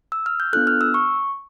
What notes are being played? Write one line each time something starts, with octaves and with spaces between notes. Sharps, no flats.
E6
F6
G6
B3 D4 F4 A4 F#6
F6
E6
C#6